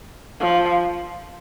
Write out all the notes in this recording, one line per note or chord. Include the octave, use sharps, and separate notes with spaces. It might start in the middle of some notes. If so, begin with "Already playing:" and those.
F3